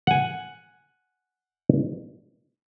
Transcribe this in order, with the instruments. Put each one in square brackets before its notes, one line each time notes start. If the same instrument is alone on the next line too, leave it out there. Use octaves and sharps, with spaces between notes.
[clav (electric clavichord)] F#5 G#5